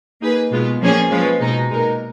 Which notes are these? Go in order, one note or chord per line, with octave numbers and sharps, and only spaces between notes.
A#3 D#4 G#4 B4
B2 G#3 B3 F4
A#2 F3 A#3 C#4 G#4
F3 G#3 C#4 F4 B4
B2 G#3 D#4
A#2 G#3 D#4 A#4